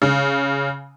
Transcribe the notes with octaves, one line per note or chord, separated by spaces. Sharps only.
C#3